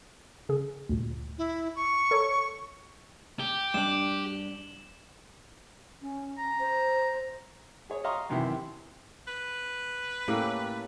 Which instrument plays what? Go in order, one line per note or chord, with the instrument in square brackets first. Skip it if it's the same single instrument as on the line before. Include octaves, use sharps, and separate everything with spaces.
[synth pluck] C#3 G#4
D2 G2 A#2
[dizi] E4
C#6
[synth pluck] A4 C#5 A#5
[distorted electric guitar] G4 [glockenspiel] G7
[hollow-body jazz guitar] G2 D4 [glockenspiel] E7 F#7
[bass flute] C#4
[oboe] A#5
[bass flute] C5
[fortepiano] G#4 C#5
D#5 F5 A#5 C6 C#6
F#2 C3 D#3 E3 E4
[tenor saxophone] B4
[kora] A2 A#3 [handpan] C#4 G4 A4